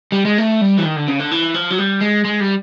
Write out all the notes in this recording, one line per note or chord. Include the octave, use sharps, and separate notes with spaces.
G3
G#3
A3
G3
E3
D#3
D3
C#3
D3
E3
F3
F#3
G3
G#3
G#3
G3